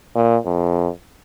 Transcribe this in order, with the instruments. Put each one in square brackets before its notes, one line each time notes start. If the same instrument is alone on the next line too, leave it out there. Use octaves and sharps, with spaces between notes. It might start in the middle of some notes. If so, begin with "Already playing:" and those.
[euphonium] A#2
F2